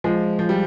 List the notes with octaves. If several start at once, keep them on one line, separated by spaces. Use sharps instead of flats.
F3 G#3
F3
G3